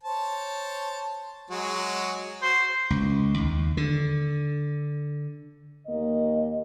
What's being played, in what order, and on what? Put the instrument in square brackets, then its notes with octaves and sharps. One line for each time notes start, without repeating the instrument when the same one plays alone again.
[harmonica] C5 C#5 A5
F#3 G#3 F#4
[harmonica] F#4 [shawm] C5
[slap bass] C#2
D#2
D3
[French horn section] D#2 A#3 D#5